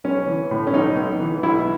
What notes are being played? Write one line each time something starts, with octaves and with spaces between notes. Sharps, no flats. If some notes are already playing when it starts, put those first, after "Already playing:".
B1 C#4
E3
A2
C#4
B1 D#4
B1
E3
B1 E4